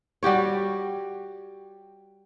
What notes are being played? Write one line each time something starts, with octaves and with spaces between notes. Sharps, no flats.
G3 F#4 G4 C#5